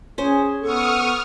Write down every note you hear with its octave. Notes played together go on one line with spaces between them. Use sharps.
C#4 G#4 C5
B3 A4 C#6 D#6 F6